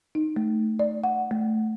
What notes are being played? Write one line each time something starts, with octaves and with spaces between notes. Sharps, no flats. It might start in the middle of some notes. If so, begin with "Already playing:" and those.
D#4
A3
D5
F#5
A3